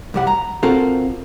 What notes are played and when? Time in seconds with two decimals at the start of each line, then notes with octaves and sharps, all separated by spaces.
0.14 C2 G3 F#5
0.27 A#5
0.63 C4 F4 F#4 A4 A#4